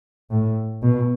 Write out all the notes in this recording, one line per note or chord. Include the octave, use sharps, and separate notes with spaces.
A2
B2